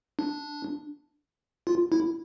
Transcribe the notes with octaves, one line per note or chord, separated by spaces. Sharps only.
D4
F4
E4